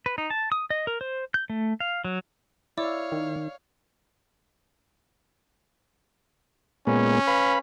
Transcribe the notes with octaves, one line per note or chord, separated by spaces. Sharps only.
B4
D#4
A5
D#6
D#5
A#4
C5
G6
A3
F5
F#3
E4 C#5 D5 F5 D6 E6
D#3
A#2 G#3 B3 C#4
B4 F5 B5